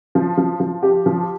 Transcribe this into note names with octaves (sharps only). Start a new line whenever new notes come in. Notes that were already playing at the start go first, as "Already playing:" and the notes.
F3
F3
F3
G4
F3